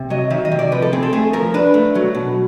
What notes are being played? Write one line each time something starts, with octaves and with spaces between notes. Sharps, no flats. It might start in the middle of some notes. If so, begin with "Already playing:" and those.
Already playing: C3
F#3 D#5
D#3 E5
D#5
C3
D5
F3 B4
A4
C4 G#4
A4
A3 G#4
F3 A#4
D4 B4
A3
F#3
B2